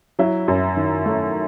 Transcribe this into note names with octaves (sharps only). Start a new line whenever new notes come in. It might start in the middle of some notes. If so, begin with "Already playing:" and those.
F#3 E4
F#2
D#3
A3